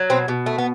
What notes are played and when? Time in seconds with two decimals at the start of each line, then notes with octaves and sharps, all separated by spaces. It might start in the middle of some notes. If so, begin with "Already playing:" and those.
Already playing: F#3
0.10 B2 C4
0.28 B2
0.46 A3
0.58 B3